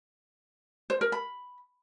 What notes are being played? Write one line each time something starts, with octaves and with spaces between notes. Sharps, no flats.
C5
A#4
B5